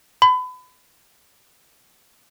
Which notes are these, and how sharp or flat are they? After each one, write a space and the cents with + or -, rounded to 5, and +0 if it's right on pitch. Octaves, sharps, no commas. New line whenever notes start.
B5 +30